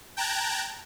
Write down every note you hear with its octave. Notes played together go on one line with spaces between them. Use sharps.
G5 A5 A#5 F#6 G#6